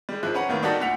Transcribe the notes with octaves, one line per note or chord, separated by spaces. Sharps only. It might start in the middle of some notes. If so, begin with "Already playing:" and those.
G3 G#3
G#1 F3 G#3 E5 F#6
C#4 B4 F#5 A#5
F1 A2 D#3 A#3 B4
G3 D#4 F#4 G4 A4 D5
D2 A#2 F#5 B6 F7